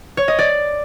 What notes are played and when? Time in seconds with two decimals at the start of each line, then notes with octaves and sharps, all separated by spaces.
0.17 C#5
0.28 D#5
0.39 D5